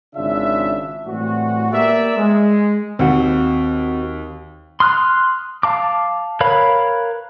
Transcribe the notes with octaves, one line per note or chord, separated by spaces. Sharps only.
G#1 C#3 D4 F4 E5
A2 E3 G3 C4 F#4
A#3 B3 G4 A#4 D5 E5
G#3
D#2 C4 F#4
C6 D#6 F6 F#6
F5 A5 D6
A#4 B4 C#5 F5 B5